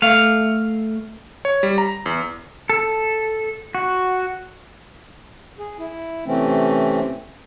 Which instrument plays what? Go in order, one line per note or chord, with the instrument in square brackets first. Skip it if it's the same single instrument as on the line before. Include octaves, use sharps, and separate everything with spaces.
[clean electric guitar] A3 F5
[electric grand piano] C#5
G3
A#5
E2
[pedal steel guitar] A4
F#4
[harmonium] G#4
E4
C3 E3 A3 C4 C#4